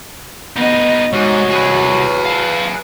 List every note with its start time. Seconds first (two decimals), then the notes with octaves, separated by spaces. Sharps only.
0.56 B3 D#4 F#4 D#5
1.13 C2 G#2 F#4 C#5 D#5
1.50 G#4 B4
2.25 F5 A5